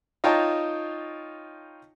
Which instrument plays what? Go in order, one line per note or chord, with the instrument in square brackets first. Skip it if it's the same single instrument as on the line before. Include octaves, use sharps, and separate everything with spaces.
[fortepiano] D#4 F4 C#5 G5 A5 A#5